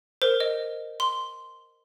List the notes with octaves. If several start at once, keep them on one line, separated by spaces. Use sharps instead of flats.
A#4 C5
D#5
C6